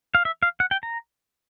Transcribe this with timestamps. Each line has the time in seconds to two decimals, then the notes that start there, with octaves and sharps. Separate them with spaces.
0.15 F5
0.25 E5
0.43 F5
0.60 F#5
0.71 G5
0.83 A#5